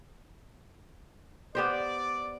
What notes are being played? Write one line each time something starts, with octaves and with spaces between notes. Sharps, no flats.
B3 G4 C5 D5